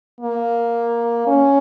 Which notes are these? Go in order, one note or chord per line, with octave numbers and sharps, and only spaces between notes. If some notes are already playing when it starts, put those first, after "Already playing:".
A#3
C#4